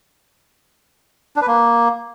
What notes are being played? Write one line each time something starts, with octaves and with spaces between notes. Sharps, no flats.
D4
B4
A#3